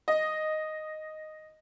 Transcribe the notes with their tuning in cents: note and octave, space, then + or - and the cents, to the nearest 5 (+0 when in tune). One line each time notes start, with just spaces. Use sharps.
D#5 +0